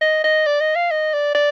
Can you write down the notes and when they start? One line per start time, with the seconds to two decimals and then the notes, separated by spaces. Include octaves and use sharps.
0.01 D#5
0.24 D#5
0.46 D5
0.60 D#5
0.76 F5
0.91 D#5
1.13 D5
1.35 D5